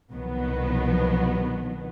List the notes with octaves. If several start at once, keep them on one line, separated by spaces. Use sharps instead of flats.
C2 B2 D#3 F3 F#3 B3